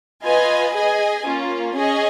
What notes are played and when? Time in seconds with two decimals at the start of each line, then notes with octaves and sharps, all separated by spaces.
0.23 F4 B4 D#5 G#5
0.73 G#4 D#5 G#5
1.24 A#3 C#4 F4
1.75 C#4 G#4 D#5 G#5